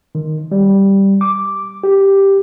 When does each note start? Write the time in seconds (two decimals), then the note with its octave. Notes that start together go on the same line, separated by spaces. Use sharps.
0.15 D#3
0.52 G3
1.21 D6
1.84 G4